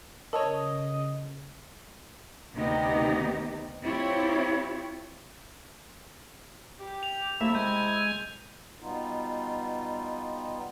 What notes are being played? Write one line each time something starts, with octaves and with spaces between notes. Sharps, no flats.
C#3 A4 A#4 C#5 D#5 A5
D2 C3 D#3 B3 D#4 G4
C4 E4 F4 G4 C#5
G4
F7
C3 A3 A#3 E4 E5
G#3 G#5 G6
B2 G3 B3 D#4 F4